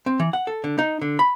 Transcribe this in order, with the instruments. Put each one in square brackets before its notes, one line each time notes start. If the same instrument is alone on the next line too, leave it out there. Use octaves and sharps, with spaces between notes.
[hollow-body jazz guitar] C4
E3
F#5
A4
D3
D#4
D3
B5